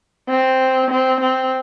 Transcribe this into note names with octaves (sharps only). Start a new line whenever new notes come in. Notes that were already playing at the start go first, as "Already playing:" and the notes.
C4
C4
C4